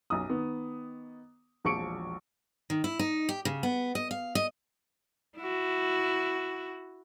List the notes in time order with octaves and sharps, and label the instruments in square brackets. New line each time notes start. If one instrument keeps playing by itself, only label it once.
[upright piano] B1 F#2 D#6
D#3 B3
E1 A#1 F3 C#6 C#7 D7
[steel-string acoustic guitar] D#3
E4
D#4
G4
C#3
B3
D#5
F5
D#5
[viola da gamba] E4 F#4